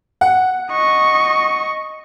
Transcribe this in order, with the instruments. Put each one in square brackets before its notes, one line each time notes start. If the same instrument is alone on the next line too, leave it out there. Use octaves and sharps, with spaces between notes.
[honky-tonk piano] F#5
[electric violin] D#5 C#6